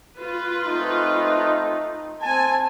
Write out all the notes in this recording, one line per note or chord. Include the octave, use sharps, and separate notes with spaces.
F4 B4
A3 C4 D#4
C4 G#5 A5